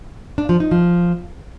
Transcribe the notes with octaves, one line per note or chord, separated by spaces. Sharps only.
D4
F3
D#4
F3